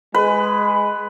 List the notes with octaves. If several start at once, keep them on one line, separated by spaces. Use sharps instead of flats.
G#3 B4